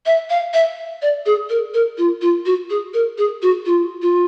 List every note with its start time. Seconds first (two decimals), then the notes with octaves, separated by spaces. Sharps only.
0.06 E5
0.30 F5
0.54 E5
1.02 D5
1.26 G#4
1.50 A#4
1.74 A#4
1.98 F4
2.22 F4
2.46 F#4
2.70 G#4
2.94 A#4
3.18 G#4
3.42 F#4
3.66 F4
4.02 F4